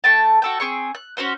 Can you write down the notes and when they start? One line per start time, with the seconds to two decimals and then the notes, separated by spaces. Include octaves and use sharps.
0.04 A3 G5 A5
0.42 F#4 A4 G5
0.60 C4 G#4 C#6
0.95 F#6
1.17 C#4 F#4 C5 F#5